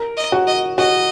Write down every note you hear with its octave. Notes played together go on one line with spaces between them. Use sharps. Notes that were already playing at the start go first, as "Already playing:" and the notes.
Already playing: A#4
D#5
F#4
D#5
F#4 D#5